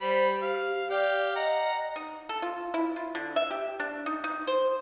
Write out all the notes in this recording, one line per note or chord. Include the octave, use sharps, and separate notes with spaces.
G3 C5 B5
G4 F5
G4 D5 F5 G5
D#5 F#5 A#5
D#4
A4
F4
E4
F4
D3
E5
G4
D4
D#4
D#4
C5